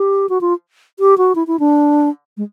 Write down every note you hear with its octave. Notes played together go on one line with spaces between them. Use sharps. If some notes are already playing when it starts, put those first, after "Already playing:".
Already playing: G4
F#4
F4
G4
F#4
E4
E4
D4
G#3